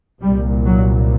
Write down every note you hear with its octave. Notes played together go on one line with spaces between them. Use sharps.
C2 A#2 G3
F#3